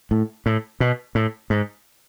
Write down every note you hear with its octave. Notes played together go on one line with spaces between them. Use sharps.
A2
A2
B2
A2
G#2